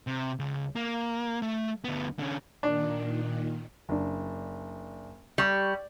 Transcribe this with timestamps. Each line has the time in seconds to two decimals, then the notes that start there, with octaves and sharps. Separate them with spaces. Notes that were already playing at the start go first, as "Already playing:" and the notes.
0.07 C3
0.39 C#2
0.76 A#3
1.42 A3
1.84 D2 B3
2.19 D3 C#4
2.63 A#2 D#3 D4
3.89 F#1 D4
5.38 G3 G4 C#6